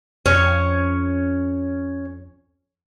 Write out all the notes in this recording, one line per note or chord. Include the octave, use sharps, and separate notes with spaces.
F2 C#4 C#5